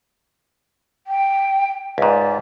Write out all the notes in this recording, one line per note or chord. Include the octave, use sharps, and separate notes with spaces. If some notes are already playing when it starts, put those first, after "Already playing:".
G5
C#2 G#2 D5